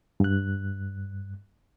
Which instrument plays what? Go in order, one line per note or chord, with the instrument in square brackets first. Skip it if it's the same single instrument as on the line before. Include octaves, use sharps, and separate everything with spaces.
[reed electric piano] G2 F#6